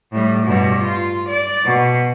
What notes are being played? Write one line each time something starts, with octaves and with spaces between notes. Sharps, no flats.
A2 G3
G2 B2
F4
D5
B2